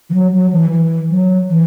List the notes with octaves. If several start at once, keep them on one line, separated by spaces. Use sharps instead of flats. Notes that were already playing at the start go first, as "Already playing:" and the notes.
E3
F#3
F#3
E3
E3
F#3
E3